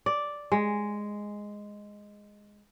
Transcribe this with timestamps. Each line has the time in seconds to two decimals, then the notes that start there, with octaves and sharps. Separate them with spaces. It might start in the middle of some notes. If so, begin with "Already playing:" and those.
0.06 D5
0.52 G#3